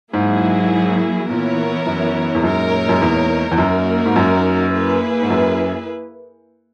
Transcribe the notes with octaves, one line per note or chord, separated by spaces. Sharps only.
G#2 F#3 A#3 E4 G#4
A#2 E3 B3 E4 A#4 C#5
F#2
E2
F#2 A#2 G#3 D#4 A#4 C#5
F#2
E2
E2
F#2 A#3 D#4 F#4 A#4
G#2
F#2
A#3 E4 G#4 B4
G#2
F#2